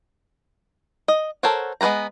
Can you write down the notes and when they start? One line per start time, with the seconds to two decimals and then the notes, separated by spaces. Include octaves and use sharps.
1.08 D#5
1.43 A4 A#4 C5 C#5 F#5
1.81 G#3 B3 B4 C5 A#5